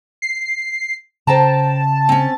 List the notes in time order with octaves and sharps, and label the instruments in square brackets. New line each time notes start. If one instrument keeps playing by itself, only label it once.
[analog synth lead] C7
[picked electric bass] C#3 [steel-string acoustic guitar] C5 G5 A#5 [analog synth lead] A5
[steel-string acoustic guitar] C4 C#4